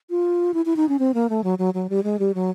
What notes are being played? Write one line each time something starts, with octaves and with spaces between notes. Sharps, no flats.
F4
E4
E4
D#4
C#4
C4
A#3
A3
F#3
F#3
F#3
G3
G#3
G3
F#3